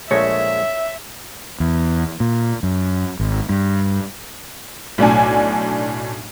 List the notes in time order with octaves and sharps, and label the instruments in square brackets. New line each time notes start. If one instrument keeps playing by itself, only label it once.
[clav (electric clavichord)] A#1 G#3 A3 [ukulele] C#5 [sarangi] E5
[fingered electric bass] E2
A#2
F#2
G#1
G2
[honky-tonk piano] B1 A2 D4 G#5